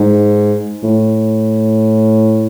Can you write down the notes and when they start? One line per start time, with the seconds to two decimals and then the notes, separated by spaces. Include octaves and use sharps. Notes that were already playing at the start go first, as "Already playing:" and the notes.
Already playing: G#2
0.83 A2